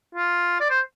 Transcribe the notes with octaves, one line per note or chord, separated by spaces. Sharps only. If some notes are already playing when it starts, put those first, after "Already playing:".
F4
D5
C5